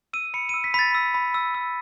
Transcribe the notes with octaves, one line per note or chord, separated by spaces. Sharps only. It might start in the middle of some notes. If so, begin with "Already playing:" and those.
E6 D#7
B5 C#7
E6 D#7
B6
B5 A6 B6
E6
B5
E6
E6